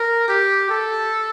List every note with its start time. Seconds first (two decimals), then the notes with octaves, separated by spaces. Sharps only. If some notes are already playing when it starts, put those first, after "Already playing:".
Already playing: A#4
0.28 G4
0.70 A4